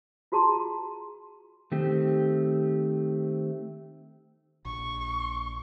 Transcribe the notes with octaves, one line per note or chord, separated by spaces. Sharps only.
F4 F#4 G#4 A5 A#5 C6
D#3 A3 C4 G4
A#1 C#6